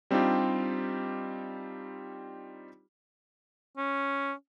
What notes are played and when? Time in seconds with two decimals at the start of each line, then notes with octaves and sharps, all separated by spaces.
0.11 G3 C4 D4 D#4 F4 G4
3.77 C#4